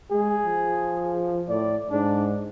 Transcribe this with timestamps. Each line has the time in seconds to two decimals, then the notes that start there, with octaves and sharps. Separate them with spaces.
0.12 G#3 G#4
0.45 F3
1.49 A2 D5
1.91 G#2 D4